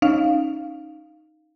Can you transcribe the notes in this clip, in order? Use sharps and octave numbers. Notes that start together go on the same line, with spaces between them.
C#4 D#4 F5